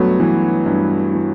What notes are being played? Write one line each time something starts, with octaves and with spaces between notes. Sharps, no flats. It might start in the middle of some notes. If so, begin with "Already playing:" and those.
Already playing: G2 F#3 A3 B3
E3
G2
E3